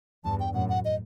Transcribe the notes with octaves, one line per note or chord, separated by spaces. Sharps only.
E2 G2 A5
G5
F#2 A2 F#5
F#5
D#5